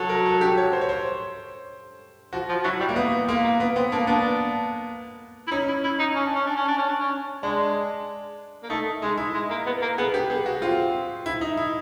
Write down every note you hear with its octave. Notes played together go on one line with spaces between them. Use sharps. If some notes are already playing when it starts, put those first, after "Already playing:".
Already playing: F#3 A4
A#4
A4
G4
C#5
C5
C#5
C5
F3 F#4
F3
F#3 E4
G3
A#3
B3
G#3 A#3
A#3
B3
B3 C4
A#3 D4
B3 D4
E4
C#4 D#4
E4
E4
D#4
C#4
D4
C#4
D4
C#4
D4
C#4
D4
C#4
G#3 D4
A#3
A3 D#4
G#3 D#4
E4
G#3
A#3
B3
A#3
B3 G#4
G4
B3 G#4
F#4
C4 F4
E4
D#4
E4